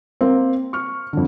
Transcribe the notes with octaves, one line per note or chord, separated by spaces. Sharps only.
A#3 C4
C#6 F6
F2 D3